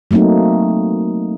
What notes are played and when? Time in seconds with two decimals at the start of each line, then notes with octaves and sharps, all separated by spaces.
0.11 F#3 A3 A#3 C4 D#4